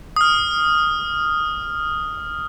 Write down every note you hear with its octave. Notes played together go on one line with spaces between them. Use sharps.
D#6 F6